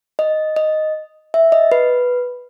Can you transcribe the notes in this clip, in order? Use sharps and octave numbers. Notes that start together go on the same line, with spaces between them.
D#5
D#5
E5
D#5
B4